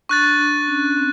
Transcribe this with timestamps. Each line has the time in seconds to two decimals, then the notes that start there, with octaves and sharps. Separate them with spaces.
0.09 D4 C#6 F#6 A6
0.39 D4
0.68 C#4
0.97 C4